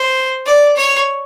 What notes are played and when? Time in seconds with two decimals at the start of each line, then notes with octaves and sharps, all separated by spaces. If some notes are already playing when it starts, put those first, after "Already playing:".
Already playing: C5
0.46 D5
0.76 C#5